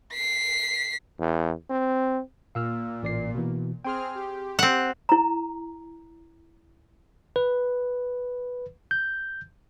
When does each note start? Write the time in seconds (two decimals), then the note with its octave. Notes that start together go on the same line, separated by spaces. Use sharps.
0.13 B6 C7
1.19 E2
1.70 C4
2.55 A#2 F5 E6 F6
3.03 A1 D5 C7
3.35 B2 E3
3.85 C4 G#4 G5 C6 F6
4.15 G4
4.59 C4 F#5
5.09 E4 A#5
7.36 B4
8.91 G6